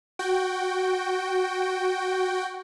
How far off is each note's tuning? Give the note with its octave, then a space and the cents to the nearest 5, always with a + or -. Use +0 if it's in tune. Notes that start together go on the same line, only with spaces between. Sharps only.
F#4 +0 G5 -5